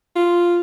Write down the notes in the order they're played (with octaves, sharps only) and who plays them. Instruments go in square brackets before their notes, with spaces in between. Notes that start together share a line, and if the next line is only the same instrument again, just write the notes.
[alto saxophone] F4